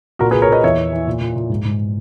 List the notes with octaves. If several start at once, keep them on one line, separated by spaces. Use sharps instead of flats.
A#2 F#4 A#4
G#4 B4
A#2
A#4 C#5
A#2 B4 D#5
E2 C#5 E5
E2
E3
A#2
A#2
A#2
G#2
G#2